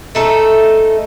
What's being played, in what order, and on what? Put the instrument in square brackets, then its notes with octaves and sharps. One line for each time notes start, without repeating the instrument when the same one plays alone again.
[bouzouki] A3 D#4 A4